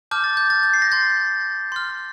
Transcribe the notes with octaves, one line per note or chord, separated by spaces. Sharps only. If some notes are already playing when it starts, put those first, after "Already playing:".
A5 D6 F6 G6
A6
G6
A6
G6
C7
A#6
C6 G6 A6
C6 F6